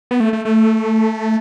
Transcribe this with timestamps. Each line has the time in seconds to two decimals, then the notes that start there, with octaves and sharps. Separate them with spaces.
0.11 B3
0.20 A3
0.33 A3
0.45 A3